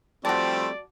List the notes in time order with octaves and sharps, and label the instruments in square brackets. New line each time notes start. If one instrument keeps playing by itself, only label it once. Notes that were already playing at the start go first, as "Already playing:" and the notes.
[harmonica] F3 G3 A3 [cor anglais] C4 [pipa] F#4 A5 [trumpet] D5